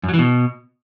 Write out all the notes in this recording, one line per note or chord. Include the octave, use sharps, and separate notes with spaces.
F#2
F#3
E3
B2